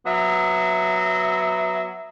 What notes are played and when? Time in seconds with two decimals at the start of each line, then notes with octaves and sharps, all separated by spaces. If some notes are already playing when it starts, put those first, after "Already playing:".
0.06 F#3 B3 E5